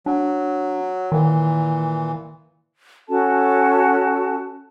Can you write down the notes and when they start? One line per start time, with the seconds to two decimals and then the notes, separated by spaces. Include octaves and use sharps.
0.06 F#3 D4
1.12 A#2 D#3 E3
3.09 C#4 F#4 A4 A5